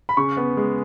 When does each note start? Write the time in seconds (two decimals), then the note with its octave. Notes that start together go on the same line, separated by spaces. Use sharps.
0.09 B5
0.17 C#3 C#6
0.37 B3
0.57 G#3